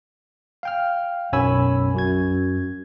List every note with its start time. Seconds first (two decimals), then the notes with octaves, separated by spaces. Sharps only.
0.63 F5 G5 F6
1.33 B1 F#2 C#5 G#5 B5 E6
1.94 F#2 F#4 G#6